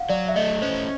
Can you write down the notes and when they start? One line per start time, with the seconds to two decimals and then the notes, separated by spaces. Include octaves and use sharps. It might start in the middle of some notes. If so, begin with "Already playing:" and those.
Already playing: F5 F#5
0.09 F#3 D5
0.28 E5
0.36 A3 D#5
0.62 C#4 C5